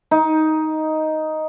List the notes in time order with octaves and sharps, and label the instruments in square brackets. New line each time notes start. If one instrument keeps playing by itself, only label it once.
[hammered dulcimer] D#4